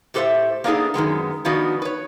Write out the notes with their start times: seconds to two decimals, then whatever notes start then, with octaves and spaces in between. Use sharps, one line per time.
0.14 A2 G4 A4 B4 C5 E5
0.64 A#3 B3 D4 D#4 G#4 A4
0.94 F#2 D#3 G#3 B3
1.45 D#3 F3 B3 D4 D#4 F#4
1.82 B4 C#5